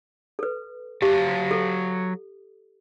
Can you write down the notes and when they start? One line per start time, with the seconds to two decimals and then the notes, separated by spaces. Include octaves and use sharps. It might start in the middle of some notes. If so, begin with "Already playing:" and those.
0.39 A4 B4
1.02 F#3 G4 F5 A5
1.51 A4